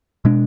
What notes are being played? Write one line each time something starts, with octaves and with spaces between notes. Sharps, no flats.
B2 G#3 D4